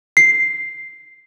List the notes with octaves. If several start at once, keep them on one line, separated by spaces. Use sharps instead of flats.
C7